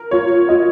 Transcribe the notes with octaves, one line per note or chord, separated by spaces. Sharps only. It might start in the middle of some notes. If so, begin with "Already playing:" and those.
Already playing: A#4
F4 C#5
F4 D#5